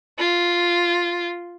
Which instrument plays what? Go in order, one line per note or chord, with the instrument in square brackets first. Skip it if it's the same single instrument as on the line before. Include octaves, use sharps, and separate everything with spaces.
[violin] F4